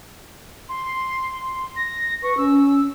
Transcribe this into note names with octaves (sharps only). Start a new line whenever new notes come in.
C6
A#6
B4 C#6
C#4 E6